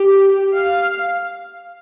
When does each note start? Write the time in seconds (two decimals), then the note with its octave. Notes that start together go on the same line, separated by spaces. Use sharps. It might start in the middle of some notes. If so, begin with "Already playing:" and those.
Already playing: G4
0.54 F5